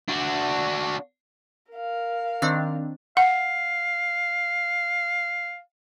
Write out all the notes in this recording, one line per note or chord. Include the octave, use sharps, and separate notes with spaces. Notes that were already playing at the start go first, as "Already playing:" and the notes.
D4 F#4
A#4 F5
D#3 C4 D4
F5 F#5